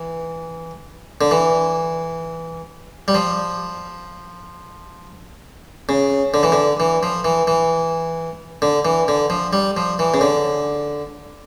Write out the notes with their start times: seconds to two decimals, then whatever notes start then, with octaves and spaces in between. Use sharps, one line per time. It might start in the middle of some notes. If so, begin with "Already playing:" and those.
Already playing: E3
1.21 D3
1.31 E3
3.08 G3
3.15 F3
5.89 C#3
6.34 D3
6.43 E3
6.52 D3
6.80 E3
7.03 F3
7.25 E3
7.47 E3
8.62 D3
8.85 E3
9.08 D3
9.30 F3
9.53 G3
9.77 F3
9.99 E3
10.14 C#3
10.21 D3